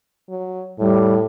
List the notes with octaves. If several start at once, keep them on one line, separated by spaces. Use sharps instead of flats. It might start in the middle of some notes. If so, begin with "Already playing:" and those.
F#3
A2 G3